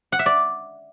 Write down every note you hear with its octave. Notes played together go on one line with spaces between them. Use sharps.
F#5
E5
D5